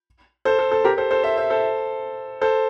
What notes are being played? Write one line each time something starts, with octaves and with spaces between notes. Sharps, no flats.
A4 C5
A4
A4
G4 A#4
A4 C5
A4 C5
C5 E5
C5 E5
A4 C5
A4 C5